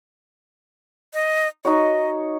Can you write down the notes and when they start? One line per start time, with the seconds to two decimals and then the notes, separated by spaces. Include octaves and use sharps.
1.14 D#5
1.65 D#4 F#4 C#5 D#5